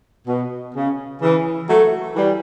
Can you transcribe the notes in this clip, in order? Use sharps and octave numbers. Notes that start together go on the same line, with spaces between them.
B2
C#3
C#3 E3
F#3 A3
E3 G3